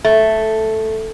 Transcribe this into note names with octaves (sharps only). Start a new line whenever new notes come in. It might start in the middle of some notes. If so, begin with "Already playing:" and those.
A3